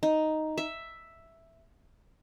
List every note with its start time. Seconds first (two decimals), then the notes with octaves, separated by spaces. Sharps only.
0.03 D#4
0.58 E5